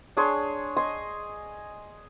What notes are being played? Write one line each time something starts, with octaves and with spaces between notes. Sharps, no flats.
D4 G#4 C#5 C6
D#5 G#5 C6